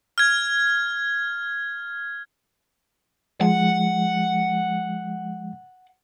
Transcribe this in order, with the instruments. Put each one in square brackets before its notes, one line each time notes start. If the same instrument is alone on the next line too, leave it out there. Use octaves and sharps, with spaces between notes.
[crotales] F6 G#6
[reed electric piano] F3 G#3 [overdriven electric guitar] F#5